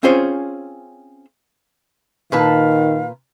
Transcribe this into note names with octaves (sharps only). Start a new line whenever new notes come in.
C4 C#4 F4 G#4 C5 C#5
A#2 D#3 B4 F5 A5